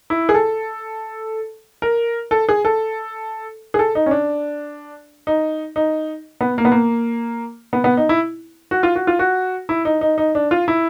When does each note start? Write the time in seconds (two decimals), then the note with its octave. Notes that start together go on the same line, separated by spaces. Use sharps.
0.10 E4
0.29 G#4
0.34 A4
1.82 A#4
2.31 A4
2.49 G#4
2.65 A4
3.74 G#4
3.79 A4
3.95 D#4
4.06 C#4
4.11 D4
5.27 D#4
5.76 D#4
6.41 B3
6.58 A#3
6.65 B3
6.72 A#3
7.73 B3
7.84 B3
7.97 D#4
8.09 E4
8.71 F#4
8.83 F4
8.95 F#4
9.07 F4
9.19 F#4
9.69 E4
9.85 D#4
10.01 D#4
10.18 D#4
10.35 D4
10.51 F4
10.68 E4